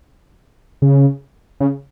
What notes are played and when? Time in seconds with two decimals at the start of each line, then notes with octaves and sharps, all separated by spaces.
0.82 C#3
1.60 C#3